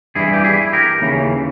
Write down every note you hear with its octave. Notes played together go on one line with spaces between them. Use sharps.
G2 E3 E4 G#4
G4
E4 G#4
G4 A#4
D#2 C#3 E3